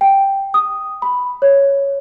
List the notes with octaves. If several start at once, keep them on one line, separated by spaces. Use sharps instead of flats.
G5
D#6
B5
C#5